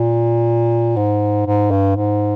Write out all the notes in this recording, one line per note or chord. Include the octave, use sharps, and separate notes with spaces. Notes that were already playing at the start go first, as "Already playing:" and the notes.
Already playing: A#2
G#2
G#2
G2
G#2